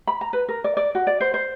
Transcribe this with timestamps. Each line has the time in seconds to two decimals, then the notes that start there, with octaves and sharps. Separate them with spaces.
0.07 B5
0.21 A#5
0.33 B4
0.49 A#4
0.64 D5
0.77 D5
0.95 F#4
1.07 D5
1.21 C5
1.34 C5